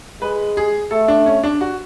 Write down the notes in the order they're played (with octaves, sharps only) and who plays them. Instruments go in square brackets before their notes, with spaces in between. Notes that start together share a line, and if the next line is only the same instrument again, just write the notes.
[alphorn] G#3 [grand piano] B4
[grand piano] G#4
[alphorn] A3 [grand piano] A4
[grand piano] D4
C#4
D4
F#4